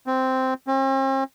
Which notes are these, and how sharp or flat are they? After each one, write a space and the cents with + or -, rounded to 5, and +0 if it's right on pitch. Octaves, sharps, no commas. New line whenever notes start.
C4 -5
C4 +45